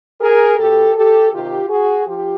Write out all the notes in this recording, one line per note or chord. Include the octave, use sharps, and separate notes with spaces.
G#4 A#4
B2 G4 A4
G4 A4
C3 D#3 F4 G4
F#4 G#4
F3 F4 G4